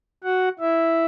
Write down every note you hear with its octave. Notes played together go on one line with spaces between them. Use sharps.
F#4 F#5
E4 E5